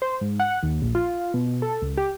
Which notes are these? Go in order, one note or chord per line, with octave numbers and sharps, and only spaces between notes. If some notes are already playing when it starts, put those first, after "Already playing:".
C5
G#2
F#5
D#2
A#1
F4
B2
A4
C#2
G4